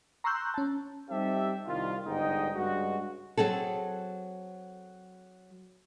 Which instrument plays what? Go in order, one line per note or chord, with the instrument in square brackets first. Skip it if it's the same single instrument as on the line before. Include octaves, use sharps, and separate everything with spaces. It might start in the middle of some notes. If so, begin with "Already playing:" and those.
[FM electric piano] A#5 C6 C#6 E6 F#6 G6
C#4 A5
[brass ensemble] G3 C4 D#4 G4 A4 E5
C2 D#3 F4
G1 G#2 G#3 D#4 D#5 G5
G2 C#3 G#3 F#4
[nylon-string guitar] F#3 C4 G#4 A4